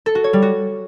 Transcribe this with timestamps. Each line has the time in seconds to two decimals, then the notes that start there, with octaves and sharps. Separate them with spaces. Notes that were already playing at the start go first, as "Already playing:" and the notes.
0.06 A4
0.15 F#4
0.24 C#5
0.33 G3
0.42 F#4